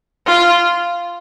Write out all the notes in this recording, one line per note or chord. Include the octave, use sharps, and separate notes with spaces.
F4